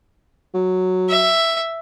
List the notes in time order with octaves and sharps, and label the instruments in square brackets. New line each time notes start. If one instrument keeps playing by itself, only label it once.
[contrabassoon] F#3
[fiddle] E5